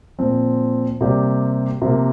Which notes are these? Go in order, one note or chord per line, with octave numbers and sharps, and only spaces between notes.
A#2 F3 C4
C3 G3 A#3 G4 D5
C3 F3 A#3